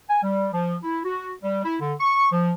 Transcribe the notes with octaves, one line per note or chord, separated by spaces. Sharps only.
G#5
G3
F3
E4
F#4
G3
E4
D3
C#6
F3